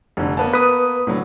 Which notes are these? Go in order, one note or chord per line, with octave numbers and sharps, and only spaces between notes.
F1 D3
A#3 B3 A5
B4 D#6
A2 D3 F#3